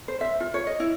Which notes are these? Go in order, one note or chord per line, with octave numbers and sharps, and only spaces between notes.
C5
E5
F4
C#5
D#5
E4